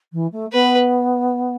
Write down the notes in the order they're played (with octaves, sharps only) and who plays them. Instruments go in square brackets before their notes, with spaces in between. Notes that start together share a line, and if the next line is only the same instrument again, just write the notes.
[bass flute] E3
A3
[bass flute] B3 [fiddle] B4